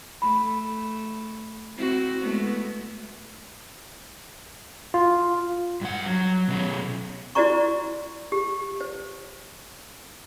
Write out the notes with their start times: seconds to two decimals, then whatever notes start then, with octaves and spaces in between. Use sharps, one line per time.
0.22 A3 B5
1.76 C4 E4 F#4
2.21 G#3 A3 B3
4.94 F4
5.81 G2 F#5
6.06 F#3
6.48 B2 C#4
7.35 E4 F#4 C5 D5 A#5 C#6
8.32 G4
8.81 C5